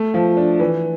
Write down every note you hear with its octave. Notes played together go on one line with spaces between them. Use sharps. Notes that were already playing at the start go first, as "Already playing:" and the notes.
Already playing: A3
F3
D4
E3